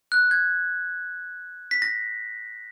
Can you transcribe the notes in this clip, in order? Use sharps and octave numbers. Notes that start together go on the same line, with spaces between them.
F#6
G#6
B6
A#6